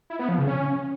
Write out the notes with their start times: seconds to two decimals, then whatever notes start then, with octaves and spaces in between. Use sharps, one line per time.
0.10 E4
0.19 B3
0.29 F3
0.38 C#3
0.48 C#4